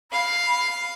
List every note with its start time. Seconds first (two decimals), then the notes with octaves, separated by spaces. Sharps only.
0.12 F5 B5